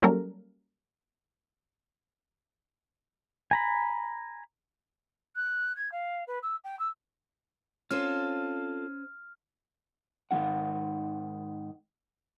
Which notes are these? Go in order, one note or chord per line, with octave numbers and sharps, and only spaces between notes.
F#3 G3 A#3 C#4 A4 A#4
G#5 A#5 B5
F#6
G#6
F5
B4
E6
G5
E6
C4 C#4 F4 A4 C5 F6
G#2 D#3 G#3 E4 F#5